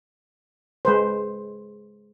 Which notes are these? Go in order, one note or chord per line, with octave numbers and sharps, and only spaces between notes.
G#3 B4 C5